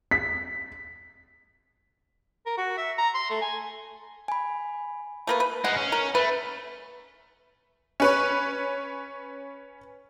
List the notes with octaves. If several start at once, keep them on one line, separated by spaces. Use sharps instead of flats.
B6
A#4
F#4
E5
A#5
C6
A3
G#5
G#5 B5
A3 A#3 B4
B4
G#3 D#4 F#5
C#4
A#4
A3 B4
C#4 B4 C#5